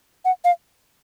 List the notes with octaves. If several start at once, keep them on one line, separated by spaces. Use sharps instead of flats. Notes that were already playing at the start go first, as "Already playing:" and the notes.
F#5
F5